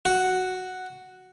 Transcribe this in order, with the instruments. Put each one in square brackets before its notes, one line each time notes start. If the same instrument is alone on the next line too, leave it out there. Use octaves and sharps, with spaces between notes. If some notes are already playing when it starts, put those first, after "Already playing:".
[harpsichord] F#4